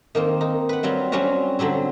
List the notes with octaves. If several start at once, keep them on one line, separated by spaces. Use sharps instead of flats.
D#3 A#3 C4
D#4
B4 F#5
F#3 G3 C4 F4
F#3 G3 C4 C#4 F4 F#4
D3 F#3 G3 C4